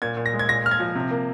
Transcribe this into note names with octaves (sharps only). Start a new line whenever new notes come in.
A#2 G#6
A#2
A#6
G#3
G#6
A#2 A#6
A#3 F6
G#6
F3
C3
A#3